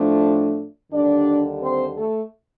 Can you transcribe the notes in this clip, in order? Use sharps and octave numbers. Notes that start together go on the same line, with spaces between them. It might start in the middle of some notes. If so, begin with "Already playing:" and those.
Already playing: A2 F3 A3 D4
D#2 D3 G3 D4 D5
C4 C5
A3 A4